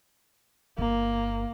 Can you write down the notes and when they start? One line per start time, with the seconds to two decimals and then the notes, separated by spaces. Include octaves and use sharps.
0.78 G1 A#3